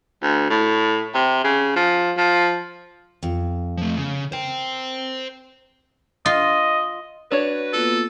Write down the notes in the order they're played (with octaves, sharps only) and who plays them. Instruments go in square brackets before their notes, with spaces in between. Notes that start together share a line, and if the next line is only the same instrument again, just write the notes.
[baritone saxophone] D2
A2
C3
C#3
F3
F3
[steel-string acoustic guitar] F2
[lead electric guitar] F3 A3
C#3
[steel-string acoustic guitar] A#4 [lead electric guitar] C5 G5
[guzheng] F4 [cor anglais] D#5
[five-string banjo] D4 C#5 [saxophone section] F#4 B4
[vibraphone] A#3 B3 F4 [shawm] A4